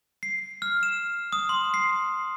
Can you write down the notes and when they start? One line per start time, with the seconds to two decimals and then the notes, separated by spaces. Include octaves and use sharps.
0.23 C7
0.62 F6
0.83 E7
1.33 D#6
1.49 C6
1.74 C7